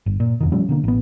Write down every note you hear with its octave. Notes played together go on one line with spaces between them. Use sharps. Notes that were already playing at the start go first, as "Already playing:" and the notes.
G1
A#2
F2 B2 D#3
F3 G3 A3 C#4
B2 D3 A#3
A1 B3